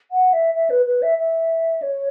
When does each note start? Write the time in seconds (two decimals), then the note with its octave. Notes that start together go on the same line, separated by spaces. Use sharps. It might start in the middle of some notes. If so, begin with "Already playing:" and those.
0.11 F#5
0.33 E5
0.54 E5
0.70 B4
0.86 B4
1.02 E5
1.18 E5
1.82 C#5